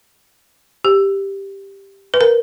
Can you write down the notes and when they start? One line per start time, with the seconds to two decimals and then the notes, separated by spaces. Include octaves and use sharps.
0.85 G4
2.14 B4
2.21 A#4